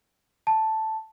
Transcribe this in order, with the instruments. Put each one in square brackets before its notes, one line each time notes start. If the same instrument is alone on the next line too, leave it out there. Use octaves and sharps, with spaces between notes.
[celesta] A5